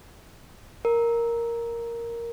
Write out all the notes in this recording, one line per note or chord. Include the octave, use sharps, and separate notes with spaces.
A#4